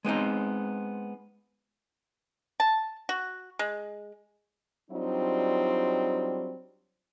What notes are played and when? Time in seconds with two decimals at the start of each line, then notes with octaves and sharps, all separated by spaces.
0.05 G#3 B3 C4 D#4
2.60 A5
3.09 F#4
3.59 G#3
4.91 F#3 G3 C4 D4 D#4 F4